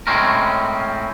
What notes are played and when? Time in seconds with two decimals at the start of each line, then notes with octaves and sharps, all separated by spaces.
0.07 A2 G#3 C4 C#4 A#4